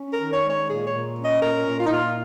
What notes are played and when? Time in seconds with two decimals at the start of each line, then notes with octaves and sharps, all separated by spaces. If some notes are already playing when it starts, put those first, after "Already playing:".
Already playing: C#4
0.12 A#4
0.19 D#3
0.32 C#5
0.43 G#3
0.49 C#5
0.68 A#2 G#4
0.86 C#5
0.93 A#2
1.17 C#4
1.24 D#5
1.42 A#2 A#4
1.66 A#2
1.78 F4
1.86 D#4
1.90 A#2 F4